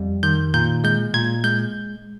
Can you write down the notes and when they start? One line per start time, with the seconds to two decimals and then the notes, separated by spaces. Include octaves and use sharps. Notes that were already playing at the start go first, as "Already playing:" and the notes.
Already playing: F2 G3
0.23 D#3 G6
0.54 A#2 G6
0.84 G#3 G6
1.14 A#2 G#6
1.44 G#3 G6